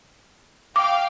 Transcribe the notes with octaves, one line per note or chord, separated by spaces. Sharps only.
F5 G5 D6